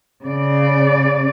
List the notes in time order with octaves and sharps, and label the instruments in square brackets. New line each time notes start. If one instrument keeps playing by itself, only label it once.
[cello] C#3 D5